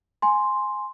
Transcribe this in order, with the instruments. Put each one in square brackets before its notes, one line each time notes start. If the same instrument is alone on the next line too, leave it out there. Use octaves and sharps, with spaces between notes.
[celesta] G#5 C6